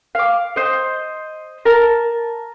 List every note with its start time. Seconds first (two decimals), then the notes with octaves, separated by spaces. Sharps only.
0.15 F5 D6
0.56 C5 D#5
1.65 A#4 A5